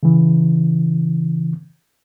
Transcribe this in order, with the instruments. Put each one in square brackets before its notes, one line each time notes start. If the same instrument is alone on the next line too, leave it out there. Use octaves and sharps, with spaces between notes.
[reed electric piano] C#3 E3